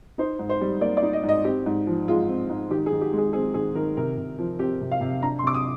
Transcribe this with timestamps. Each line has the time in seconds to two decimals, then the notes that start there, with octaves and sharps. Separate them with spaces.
0.18 D#4 C5
0.39 G#2
0.49 C5
0.61 G3
0.81 A#3 D5
0.97 D5
1.03 D#4
1.13 D#5
1.23 G#2
1.29 D#5
1.44 C4 G4
1.66 G#2
1.87 F3
2.08 G#3 F4
2.28 C4
2.49 G#2
2.70 D#3 G4
2.86 G#4
2.92 D#3
3.01 G4
3.13 G#3 G#4
3.33 C4 G#4
3.54 D#3 G#4
3.75 D#3 A#4
3.97 C3 A#4
4.17 C3
4.39 F3
4.59 C4 G4
4.81 C3
4.91 F5
5.01 C3
5.22 D4 A#5
5.39 C6
5.43 C3 D6
5.54 D#6